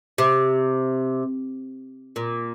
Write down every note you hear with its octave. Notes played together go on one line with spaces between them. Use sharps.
C3
A#2